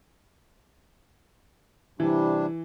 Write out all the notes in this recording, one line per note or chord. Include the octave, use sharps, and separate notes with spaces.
C3 E3 G3 D4